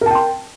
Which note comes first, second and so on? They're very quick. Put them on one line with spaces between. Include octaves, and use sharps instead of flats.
A#4 A5 G5 C6